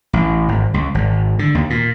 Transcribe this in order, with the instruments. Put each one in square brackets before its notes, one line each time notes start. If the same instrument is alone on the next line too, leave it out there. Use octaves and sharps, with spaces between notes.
[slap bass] A1
G#1
C#2
G#1
D3
D#2
A#2